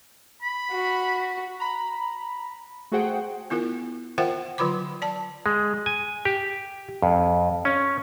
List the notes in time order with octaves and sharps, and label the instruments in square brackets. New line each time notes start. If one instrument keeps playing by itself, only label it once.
[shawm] B5
[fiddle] F#4
[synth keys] A#5 B5
A3 F#4 G#4 C5 F#5 G5
[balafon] B3 E4 F4 A#4
F4 A#4 C5 E5 F#5 G5
D3 F#3 F4 B4 B5 D6
D5 A5
[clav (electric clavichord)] G#3
G#5
G4
F2
C#4